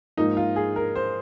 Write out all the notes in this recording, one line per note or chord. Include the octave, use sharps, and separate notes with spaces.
G#2 F3 A#3 D#4
F4
G#4
A#4
C5